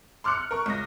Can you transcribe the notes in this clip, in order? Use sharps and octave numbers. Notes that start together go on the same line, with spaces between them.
C6 D6 F6 F#6 C#7
F6
A#4 C#6
C#2 A#6